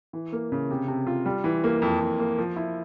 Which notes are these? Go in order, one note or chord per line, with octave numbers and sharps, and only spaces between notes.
E3
A#3
C#3
C3
C3
F4
G3
E3
A#3
F2
F2
A#3
F3
E4